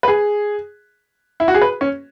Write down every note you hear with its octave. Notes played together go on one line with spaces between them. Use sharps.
B4
G#4
E4
F#4
G#4
B4
C#4